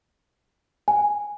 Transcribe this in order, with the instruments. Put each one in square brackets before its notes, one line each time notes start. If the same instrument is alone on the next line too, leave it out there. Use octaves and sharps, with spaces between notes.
[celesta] G#5